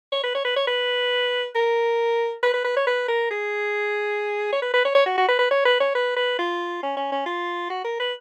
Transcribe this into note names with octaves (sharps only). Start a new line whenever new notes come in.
C#5
B4
C#5
B4
C#5
B4
A#4
B4
B4
B4
C#5
B4
A#4
G#4
C#5
B4
B4
C#5
C#5
F#4
F#4
B4
B4
C#5
B4
C#5
B4
B4
F4
C#4
C#4
C#4
F4
F#4
A#4
B4